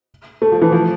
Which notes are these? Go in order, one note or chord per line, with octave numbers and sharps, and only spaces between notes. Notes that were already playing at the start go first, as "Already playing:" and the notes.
A3
F3
E3
F3